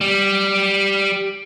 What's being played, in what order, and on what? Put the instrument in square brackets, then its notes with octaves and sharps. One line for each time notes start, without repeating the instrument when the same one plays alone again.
[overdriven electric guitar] G3